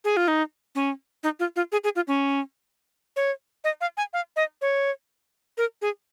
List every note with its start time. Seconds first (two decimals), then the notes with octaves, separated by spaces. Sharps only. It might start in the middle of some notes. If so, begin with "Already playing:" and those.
0.04 G#4
0.17 F4
0.28 D#4
0.75 C#4
1.23 D#4
1.40 F4
1.56 F4
1.72 G#4
1.84 G#4
1.96 F4
2.08 C#4
3.16 C#5
3.64 D#5
3.81 F5
3.97 G#5
4.13 F5
4.36 D#5
4.62 C#5
5.58 A#4
5.82 G#4